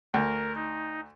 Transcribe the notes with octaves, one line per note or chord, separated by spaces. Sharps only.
D2 A#4
D#4